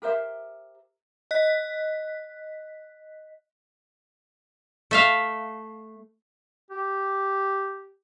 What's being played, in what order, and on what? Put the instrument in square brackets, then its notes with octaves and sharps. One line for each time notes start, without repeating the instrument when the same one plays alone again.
[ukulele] G4 A#4 C5 E5
[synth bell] D#5 F#6 B6
[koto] A3 E5 F5
[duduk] G4